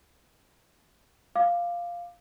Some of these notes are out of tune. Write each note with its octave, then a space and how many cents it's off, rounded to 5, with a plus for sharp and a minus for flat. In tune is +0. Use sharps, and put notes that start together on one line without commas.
F5 +0 D6 +15